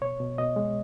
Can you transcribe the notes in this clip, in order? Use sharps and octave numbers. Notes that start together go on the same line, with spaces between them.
B2 C#5
B2
B2 D#5
G#3